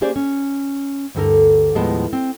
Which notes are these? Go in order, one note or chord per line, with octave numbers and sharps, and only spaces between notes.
A#3 C#4 G4 G#4 C5 D5
C#4
D2 G2 D3 A4 A#4
D#2 A2 F3 G#3 B3 A5
C4